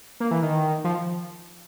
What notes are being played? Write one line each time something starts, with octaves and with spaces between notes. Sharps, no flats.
A#3
E3
D#3
F3